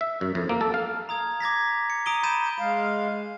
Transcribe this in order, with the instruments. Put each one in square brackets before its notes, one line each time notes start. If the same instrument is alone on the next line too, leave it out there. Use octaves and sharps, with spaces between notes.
[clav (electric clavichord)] E5
F#2
F2
A#3
A4
F5
[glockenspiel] A#5 D#6 G#6
D6 G#6 A#6 B6
C#7
A#5 D#6 D7 D#7 G7
B5 G6 A6 D#7 E7
[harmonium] G#3 F5